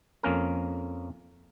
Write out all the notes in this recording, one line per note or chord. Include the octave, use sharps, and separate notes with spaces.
F2 A#3 C#4 A#4